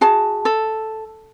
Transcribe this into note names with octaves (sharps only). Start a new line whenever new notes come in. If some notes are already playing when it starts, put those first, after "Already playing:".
F#4 G#4 A5
A4